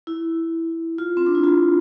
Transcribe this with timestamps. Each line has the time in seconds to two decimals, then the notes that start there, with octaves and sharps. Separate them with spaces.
0.07 E4
0.98 F4
1.17 C4
1.26 D4
1.35 E4
1.44 F4